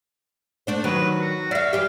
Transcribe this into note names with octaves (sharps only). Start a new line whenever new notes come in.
A3 D4 C5
D#3 F#3 B4
F#4
D5 E5 F5
E3 G3 G4